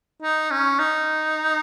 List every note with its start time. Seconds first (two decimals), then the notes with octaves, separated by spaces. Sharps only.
0.22 D#4
0.51 C#4
0.79 D#4